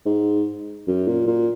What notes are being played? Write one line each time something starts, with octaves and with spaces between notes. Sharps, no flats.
G#2
F#2
A#2
A#2